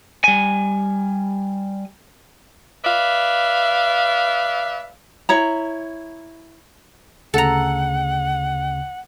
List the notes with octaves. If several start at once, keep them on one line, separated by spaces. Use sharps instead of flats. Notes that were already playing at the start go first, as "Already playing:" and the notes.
G3 G#5
B4 D5 E5 F5
E4 C#5 A#5
D2 C#3 A4 F#5 A#5 C#7